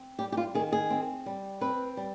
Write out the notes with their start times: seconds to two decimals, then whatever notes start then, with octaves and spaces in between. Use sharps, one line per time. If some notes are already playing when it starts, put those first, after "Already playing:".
Already playing: C4
0.19 G3 G4
0.32 G4
0.37 F4
0.55 D#3 G#4
0.72 G#4
0.90 C4
1.26 G3
1.61 C4 B4
1.97 G3